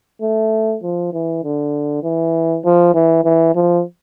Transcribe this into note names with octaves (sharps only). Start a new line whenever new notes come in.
A3
F3
E3
D3
E3
F3
E3
E3
F3